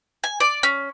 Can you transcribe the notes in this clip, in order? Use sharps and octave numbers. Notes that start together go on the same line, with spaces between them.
G#5
D5
C#4